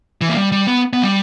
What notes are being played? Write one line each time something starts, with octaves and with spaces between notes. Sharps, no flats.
E3
A#3
G3
G3
B3
B3
G3